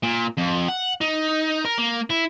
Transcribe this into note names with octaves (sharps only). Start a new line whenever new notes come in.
A#2
F2
F#5
D#4
A#4
A#3
E4